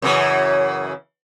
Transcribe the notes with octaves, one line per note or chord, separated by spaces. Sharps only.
F#2 C#3 E3